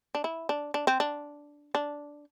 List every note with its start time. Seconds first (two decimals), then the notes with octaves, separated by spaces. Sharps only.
0.15 D4
0.24 E4
0.49 D4
0.74 D4
0.87 C4
1.00 D4
1.75 D4